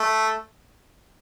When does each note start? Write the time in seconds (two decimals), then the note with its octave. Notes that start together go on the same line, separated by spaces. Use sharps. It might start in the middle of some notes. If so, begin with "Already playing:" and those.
Already playing: A3